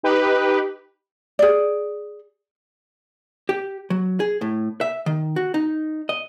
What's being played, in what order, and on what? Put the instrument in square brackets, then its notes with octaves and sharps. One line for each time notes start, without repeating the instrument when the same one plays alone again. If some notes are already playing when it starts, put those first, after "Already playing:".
[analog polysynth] D#4 G4 B4
[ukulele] G#4 D5
[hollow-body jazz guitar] G4
F#3
G#4
A2
E5
D#3
F#4
D#4
D#5